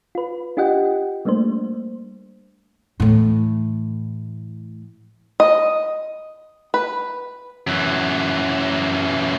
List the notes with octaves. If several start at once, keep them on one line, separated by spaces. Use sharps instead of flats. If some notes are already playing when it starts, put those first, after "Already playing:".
F4 B4
D4 F4 G4 D#5 F#5 G5
G3 A3 A#3 D4 C5
A2 E3
D#5
B4
F#2 E3